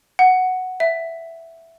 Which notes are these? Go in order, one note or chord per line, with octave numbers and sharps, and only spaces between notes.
F#5
E5